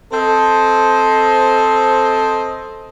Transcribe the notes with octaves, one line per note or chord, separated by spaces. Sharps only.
C4 A4 C5 D#5